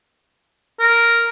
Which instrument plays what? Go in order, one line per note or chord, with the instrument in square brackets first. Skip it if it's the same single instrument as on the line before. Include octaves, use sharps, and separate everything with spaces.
[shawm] A#4